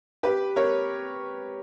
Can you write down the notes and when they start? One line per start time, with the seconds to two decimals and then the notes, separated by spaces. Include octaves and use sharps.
0.23 G4 B4
0.56 A#4 C#5